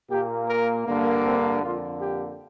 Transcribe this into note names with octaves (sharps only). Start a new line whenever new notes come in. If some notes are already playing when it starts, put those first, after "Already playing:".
A#2 A#3 G4
A#4
G2 D3 A#3
C4
F2 D3 A#3 F4
G4